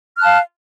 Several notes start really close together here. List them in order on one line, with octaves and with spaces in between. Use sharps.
F6 F#6 A5 F5